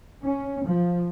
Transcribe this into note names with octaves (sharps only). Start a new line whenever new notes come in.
C#4
F3